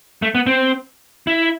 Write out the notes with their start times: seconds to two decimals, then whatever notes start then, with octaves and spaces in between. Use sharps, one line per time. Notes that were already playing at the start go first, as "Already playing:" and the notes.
0.22 A3
0.35 B3
0.46 C4
1.27 E4